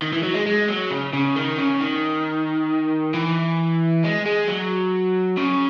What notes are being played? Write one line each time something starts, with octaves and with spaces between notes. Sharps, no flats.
D#3
E3
F#3
G#3
G#3
F#3
C#3
C#3
D#3
C#3
D#3
E3
G#3
G#3
F#3
C#3